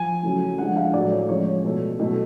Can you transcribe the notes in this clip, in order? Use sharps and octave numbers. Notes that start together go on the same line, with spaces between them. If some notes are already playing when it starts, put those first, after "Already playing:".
Already playing: F3 G#5
C#3 F#3 A3
D3 F3 G#3 F#5
F5
A2 F#3 A3 D5
C#5
C#3 F3 G#3 C#5
B2 A3
B2 F#3 A3